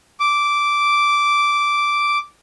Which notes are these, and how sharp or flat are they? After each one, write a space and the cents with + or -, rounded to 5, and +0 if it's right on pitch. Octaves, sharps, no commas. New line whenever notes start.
D6 -5